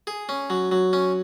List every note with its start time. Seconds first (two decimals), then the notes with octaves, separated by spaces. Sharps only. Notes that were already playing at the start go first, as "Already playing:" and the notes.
0.07 G#4
0.29 C#4
0.50 F#3
0.71 F#3
0.93 C#4